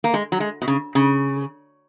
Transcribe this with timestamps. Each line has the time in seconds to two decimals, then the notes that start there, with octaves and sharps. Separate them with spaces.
0.04 A#3
0.14 G#3
0.32 F#3
0.40 G#3
0.62 B2
0.68 C#3
0.95 C#3